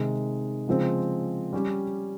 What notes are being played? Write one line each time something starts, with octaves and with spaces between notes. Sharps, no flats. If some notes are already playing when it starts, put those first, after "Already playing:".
Already playing: C3 D#3 G#3
C#3 F3 G#3 C4
G3 C#4 G4